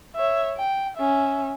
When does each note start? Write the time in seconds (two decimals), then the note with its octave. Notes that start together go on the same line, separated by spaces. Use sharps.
0.16 C#5 E5
0.57 G5
0.98 C#4 E5